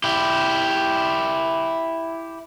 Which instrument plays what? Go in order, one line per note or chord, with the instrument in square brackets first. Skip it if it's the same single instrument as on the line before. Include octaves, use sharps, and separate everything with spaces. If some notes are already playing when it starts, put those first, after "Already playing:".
[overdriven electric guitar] E4 G4